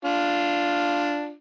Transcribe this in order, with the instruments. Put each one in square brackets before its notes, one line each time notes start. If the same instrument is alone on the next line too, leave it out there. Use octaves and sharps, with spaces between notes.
[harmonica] D4 F4